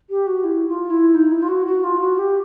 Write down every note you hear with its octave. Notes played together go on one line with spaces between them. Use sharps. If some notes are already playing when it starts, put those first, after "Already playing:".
G4
F#4
E4
F4
E4
D#4
E4
F4
F#4
F#4
F4
F#4
G4